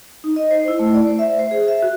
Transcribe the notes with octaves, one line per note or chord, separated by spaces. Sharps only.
D#4
D#5
C5
E4
A3
D5
C5
E5
C5
G#4
E5
F#4